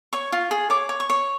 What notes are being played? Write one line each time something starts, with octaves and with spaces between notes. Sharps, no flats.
C#5 C#6
F4
G#4
C#5 D6
C#5
C#6
C#5